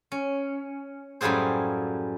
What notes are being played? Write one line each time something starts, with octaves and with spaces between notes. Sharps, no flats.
C#4
F#2 A2 G3 F4 G#4 C5